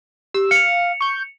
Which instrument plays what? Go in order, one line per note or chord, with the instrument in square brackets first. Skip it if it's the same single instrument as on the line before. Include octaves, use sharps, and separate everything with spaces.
[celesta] G4 [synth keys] E6
[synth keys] F5 [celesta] C#7 F7
[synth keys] C#6 G6